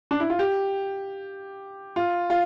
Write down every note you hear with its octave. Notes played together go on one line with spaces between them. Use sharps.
D4
E4
F4
G4
F4
F4